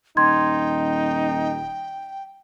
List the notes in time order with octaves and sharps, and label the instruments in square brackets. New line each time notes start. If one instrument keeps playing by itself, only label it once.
[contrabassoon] D#1 [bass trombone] D#4 [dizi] G5 [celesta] C6 G#6